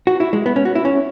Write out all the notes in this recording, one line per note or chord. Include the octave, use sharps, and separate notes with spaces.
F#4
E4
G#3
B3
C#4
F#4
E4
C#4